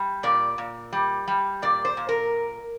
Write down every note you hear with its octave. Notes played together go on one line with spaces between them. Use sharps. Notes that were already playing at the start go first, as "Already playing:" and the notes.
Already playing: G3
A#2 D5
A#2
G3
G3
A#2 D5
C5
A#2
A#4